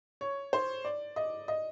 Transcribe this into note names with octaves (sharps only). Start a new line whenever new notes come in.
C#5
C5
D5
D#5
D#5